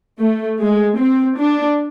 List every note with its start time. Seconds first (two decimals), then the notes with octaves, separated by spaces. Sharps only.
0.19 A3
0.59 G#3
0.97 C4
1.37 D4